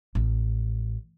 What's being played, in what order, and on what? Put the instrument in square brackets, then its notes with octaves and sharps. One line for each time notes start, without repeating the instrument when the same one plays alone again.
[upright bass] A1